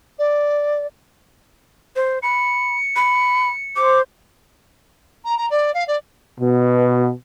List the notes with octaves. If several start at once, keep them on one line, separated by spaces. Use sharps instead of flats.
D5
C5
B5 C#7
B5
C5 D6
A#5
A#5
D5
F5
D5
B2